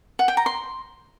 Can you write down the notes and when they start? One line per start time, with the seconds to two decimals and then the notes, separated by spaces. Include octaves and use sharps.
0.19 F#5
0.28 G5
0.37 A#5
0.46 C6